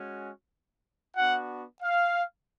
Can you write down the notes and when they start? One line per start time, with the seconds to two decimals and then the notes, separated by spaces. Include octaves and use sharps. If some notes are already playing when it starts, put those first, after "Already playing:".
Already playing: G#3 C#4 F#4
1.16 B3 D4 F#4 F#5
1.83 F5